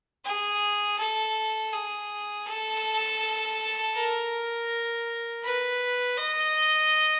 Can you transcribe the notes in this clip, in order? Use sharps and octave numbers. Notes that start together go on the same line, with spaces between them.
G#4
A4
G#4
A4
A#4
B4
D#5